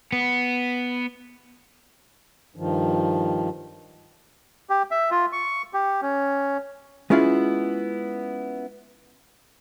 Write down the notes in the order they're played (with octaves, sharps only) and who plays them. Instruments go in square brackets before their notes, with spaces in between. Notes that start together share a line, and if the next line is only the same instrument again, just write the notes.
[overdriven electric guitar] B3
[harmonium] G2 D#3 F3
[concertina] G4
E5
F4
C#6
G4
C#4
[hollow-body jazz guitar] G#3 B3 C#4 E4 F4 G#4